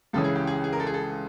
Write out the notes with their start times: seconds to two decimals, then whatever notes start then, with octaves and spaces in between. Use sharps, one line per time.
0.13 C#2 C#3 E3 A4
0.24 G#4
0.36 G4
0.47 G#4
0.64 G#4
0.73 A#4
0.80 A4
0.87 G#4
0.94 A4